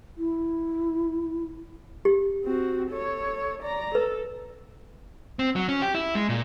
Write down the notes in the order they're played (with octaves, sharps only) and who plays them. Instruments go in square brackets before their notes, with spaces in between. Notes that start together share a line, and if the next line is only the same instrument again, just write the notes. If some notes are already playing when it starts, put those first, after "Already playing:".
[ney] E4
[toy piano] G4
[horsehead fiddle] C4 F#4
A4 C#5
D5 A#5
[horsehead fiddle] A4 [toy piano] B4
[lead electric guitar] C4
F#3
C#4
G4
E4
G#3
A#2